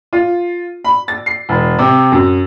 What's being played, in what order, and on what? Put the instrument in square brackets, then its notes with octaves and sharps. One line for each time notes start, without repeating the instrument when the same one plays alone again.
[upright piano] F4
B5
A6
C7
E1
C3
F#2